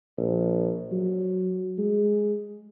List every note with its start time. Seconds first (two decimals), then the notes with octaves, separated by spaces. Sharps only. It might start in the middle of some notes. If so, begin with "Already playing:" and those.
0.18 A#1
0.92 F#3
1.78 G#3